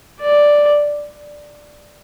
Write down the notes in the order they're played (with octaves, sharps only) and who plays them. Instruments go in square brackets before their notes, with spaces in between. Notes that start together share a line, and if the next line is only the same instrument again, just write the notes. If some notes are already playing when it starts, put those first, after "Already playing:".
[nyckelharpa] D5